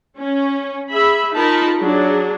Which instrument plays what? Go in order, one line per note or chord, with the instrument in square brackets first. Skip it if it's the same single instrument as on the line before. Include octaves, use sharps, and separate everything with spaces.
[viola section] C#4
G#4 E5 B5
D#4 F4 A#4 A5 B5
F#3 D4 G#4